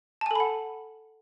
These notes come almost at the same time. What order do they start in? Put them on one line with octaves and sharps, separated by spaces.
A5 G#5 A4 B5 F#5